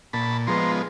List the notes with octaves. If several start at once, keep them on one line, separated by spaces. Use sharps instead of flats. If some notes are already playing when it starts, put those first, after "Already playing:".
A#2 A5 B5
F3 G#3 B3 A#5 C6